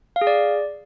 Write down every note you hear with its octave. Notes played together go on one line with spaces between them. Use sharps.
F5
G#4
D5